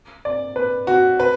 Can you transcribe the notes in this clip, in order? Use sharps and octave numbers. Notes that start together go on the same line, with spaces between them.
D5
B4
F#4
B4